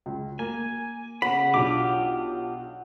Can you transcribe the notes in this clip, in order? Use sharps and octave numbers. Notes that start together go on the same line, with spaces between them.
C#2
A#3 G#5
C#3 F#5 B5
B1 D4 F4 G4 D6